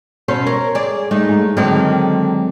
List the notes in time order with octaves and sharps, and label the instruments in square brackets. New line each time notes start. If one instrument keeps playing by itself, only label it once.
[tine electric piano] B2 [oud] C#4 A4 C5
[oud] A#4 [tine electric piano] C#5
[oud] G#4 D5
G#3 A3 D#4
[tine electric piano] G#2
[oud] D3 D#3 [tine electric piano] F#3 G#3 C4